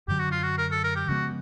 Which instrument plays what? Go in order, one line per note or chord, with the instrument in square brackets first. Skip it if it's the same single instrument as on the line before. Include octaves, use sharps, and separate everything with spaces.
[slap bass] F#2 D3 F#3 [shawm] G4
[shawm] F#4
F4
F#4
A#4
A4
A#4
G4
[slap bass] C#3 F3 G#3 B3 [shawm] F#4